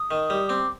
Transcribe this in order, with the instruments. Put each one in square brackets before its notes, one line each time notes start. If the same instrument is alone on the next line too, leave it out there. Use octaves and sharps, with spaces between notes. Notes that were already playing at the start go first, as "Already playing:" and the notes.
Already playing: [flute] D#6
[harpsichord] D#3
G3
[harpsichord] C4 [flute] D6